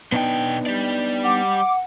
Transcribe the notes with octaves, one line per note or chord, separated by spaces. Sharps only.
B2 B3 D4 D#4 G5
G3 D5
F#5 D6